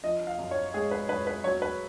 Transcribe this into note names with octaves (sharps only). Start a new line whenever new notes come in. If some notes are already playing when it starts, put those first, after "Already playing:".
F3 D#5
F5
F#2
C#5
G#3 G#4
B4
F#2 B4
B4
F#3 C#5
B4